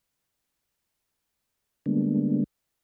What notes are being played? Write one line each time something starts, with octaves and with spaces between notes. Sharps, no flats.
D3 G3 G#3 A#3 B3 D4